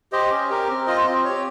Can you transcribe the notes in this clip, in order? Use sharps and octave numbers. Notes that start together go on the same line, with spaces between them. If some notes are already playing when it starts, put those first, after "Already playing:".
G4 C5 D#5
C#4
G4 A#4
C4
F4 C5 D#5
C4
C#5
G4